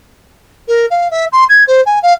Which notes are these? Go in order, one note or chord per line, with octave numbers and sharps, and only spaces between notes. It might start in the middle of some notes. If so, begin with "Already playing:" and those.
A#4
F5
E5
C6
G#6
C5
G#5
F5